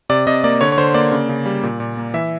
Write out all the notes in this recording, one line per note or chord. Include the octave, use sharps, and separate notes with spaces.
C3 D5
C3 D#5
A#3 D5
D3 C#5
C#5
D3 C5
A#3 D5
C#3
C#3
G3
A#2
A#2
A#3
E3 E5